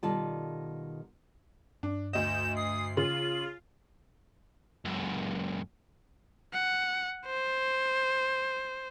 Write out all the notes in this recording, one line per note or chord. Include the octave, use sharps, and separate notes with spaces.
B2 D#3 G3 F4 A4 A5
G2 D4
D2 D#5 G6 E7
D#6 C7
C#3 F4 F#7
C#2 F#2
F#5
C5